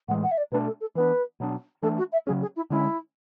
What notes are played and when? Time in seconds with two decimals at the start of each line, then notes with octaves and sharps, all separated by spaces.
0.08 A2 E3 G#3 F#5
0.23 F#5
0.31 E5
0.37 D5
0.52 B2 A3 D4 B4
0.66 A4
0.81 A4
0.95 E3 B3 D4 B4
1.40 B2 F#3 B3 D4
1.82 E3 A3 D4 A4
1.98 F#4
2.12 E5
2.26 C#3 F#3 C#4 G#4
2.41 G#4
2.56 E4
2.70 D3 G#3 C#4 E4